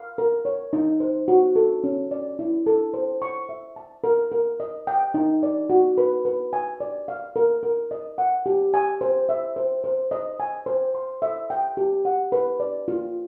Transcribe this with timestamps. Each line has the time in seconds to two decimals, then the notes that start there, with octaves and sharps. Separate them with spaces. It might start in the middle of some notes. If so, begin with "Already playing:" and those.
Already playing: F5
0.18 A#4
0.45 C#5
0.73 D#4
1.00 C5
1.28 F#4
1.56 A4
1.84 C#4
2.11 D5
2.39 E4
2.66 A4
2.94 C5
3.22 C#6
3.49 E5
3.76 A5
4.04 A#4
4.32 A#4
4.60 D#5
4.87 G5
5.14 D#4
5.43 D5
5.70 F#4
5.98 B4
6.25 B4
6.53 G#5
6.80 D5
7.08 F5
7.36 A#4
7.63 A#4
7.91 D#5
8.18 F#5
8.46 G4
8.74 G#5
9.01 C5
9.29 E5
9.56 C5
9.84 C5
10.11 D#5
10.40 G#5
10.66 C5
10.95 C6
11.22 E5
11.50 G5
11.77 G4
12.05 F#5
12.32 B4
12.60 D5
12.88 F4